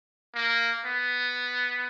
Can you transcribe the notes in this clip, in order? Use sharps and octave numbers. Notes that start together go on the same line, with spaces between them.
A#3
B3